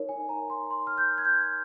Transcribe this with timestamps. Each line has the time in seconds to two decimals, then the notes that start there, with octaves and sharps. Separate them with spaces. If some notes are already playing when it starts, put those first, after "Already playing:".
Already playing: D#4 A#4 C#5
0.09 G#5
0.29 A#5
0.50 C6
0.71 C6
0.87 F6
0.98 G6
1.18 G#6
1.25 G6